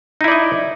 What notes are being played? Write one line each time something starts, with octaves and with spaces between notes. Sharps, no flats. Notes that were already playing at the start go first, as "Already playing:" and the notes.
D#4 E4 D5 D#5